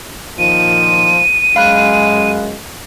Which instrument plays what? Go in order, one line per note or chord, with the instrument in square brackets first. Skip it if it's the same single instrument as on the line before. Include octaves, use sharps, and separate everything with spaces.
[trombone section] A#2 D#3 F3 [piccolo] D#7
[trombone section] F#2 G#3 [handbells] F5 B5 F#6